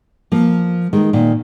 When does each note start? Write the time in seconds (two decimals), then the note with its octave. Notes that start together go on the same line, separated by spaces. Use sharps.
0.32 F3 A#3
0.93 D#3 G#3
1.13 A#2 D#3